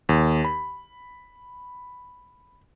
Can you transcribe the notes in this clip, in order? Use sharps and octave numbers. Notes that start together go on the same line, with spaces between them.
D#2
B5